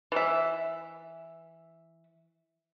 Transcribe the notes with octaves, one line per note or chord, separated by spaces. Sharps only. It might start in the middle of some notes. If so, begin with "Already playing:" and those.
E3 E5